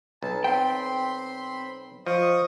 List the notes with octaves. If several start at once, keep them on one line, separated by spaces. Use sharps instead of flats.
B1 A5
C4 G5 B5 C6
F3 D#5 C#6 D#6